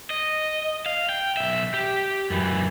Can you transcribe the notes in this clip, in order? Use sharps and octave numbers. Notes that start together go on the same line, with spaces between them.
D#5
F5
G5
B1 E5
G4
F#2 E3